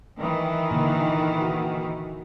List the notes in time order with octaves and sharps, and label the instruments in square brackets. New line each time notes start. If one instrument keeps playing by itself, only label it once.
[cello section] D#3 E3
[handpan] A#2 D3
F#4